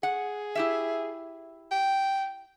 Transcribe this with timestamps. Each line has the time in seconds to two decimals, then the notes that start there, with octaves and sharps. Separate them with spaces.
0.03 G#4 F#5
0.55 E4 G4 E5
1.71 G5